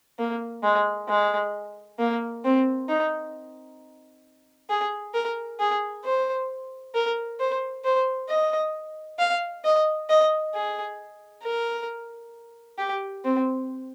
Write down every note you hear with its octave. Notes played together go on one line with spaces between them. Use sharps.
A#3
G#3
G#3
A#3
C4
D#4
G#4
A#4
G#4
C5
A#4
C5
C5
D#5
F5
D#5
D#5
G#4
A#4
G4
C4